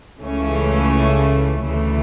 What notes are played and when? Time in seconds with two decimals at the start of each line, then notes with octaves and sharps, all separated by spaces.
0.21 C#2 C#3 E3 A3 C#4
1.65 D2 C#3 E3 A3